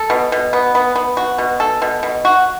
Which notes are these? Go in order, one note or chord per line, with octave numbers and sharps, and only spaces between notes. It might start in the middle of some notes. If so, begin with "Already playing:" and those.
Already playing: A4
B2
B2
B3
B3
B3
F#4
B2
A4
B2
B2
F#4